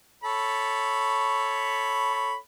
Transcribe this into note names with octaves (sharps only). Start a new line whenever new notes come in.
A4 C#5 B5